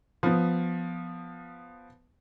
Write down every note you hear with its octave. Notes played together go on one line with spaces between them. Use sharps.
F3 B3